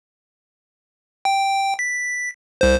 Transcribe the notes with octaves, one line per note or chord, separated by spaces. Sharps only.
G5
B6
C2 C5